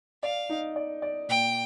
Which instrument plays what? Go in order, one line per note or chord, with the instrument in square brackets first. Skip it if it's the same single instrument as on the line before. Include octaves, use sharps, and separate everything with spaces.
[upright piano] D5 [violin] F5
[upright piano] D#4
D5
D5
[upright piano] A#2 [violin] G5